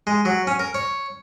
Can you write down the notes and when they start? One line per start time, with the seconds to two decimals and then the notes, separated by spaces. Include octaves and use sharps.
0.07 G#3
0.25 F#3
0.47 C#4
0.59 A#4
0.75 C#5